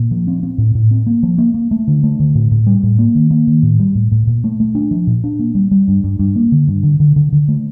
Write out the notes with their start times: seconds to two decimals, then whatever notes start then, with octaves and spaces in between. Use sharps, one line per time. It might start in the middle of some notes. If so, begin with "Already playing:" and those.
Already playing: A#2
0.11 F3
0.27 C4
0.43 C4
0.58 A2
0.75 A2
0.91 C4
1.06 A#3
1.23 F3
1.38 A#3
1.54 A#3
1.71 A3
1.87 D3
2.03 A3
2.20 D3
2.35 A2
2.51 A2
2.67 G3
2.83 A2
2.99 A#3
3.15 D#3
3.31 A#3
3.47 D#3
3.63 A2
3.79 G3
3.95 A2
4.12 A2
4.27 A#2
4.44 A3
4.60 A3
4.75 D4
4.91 F3
5.07 A#2
5.24 D4
5.39 A#3
5.55 G3
5.71 G3
5.88 G2
6.04 G2
6.19 G2
6.36 A#3
6.52 D3
6.68 G2
6.83 D3
7.00 D3
7.16 D3
7.32 D3
7.48 A3